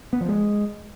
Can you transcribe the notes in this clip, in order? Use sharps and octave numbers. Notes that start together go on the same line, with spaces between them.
B3
F3
G#3